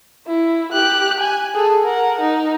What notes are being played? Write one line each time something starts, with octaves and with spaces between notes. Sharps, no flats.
E4
G4 F#6
G#5
G#4 A4
A#4 F#5
D#4